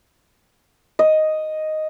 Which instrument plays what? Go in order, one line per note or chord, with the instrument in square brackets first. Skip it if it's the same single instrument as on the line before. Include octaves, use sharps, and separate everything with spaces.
[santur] D#5